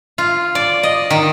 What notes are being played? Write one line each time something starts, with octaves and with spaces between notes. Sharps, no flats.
F4
D5
D#5
D#3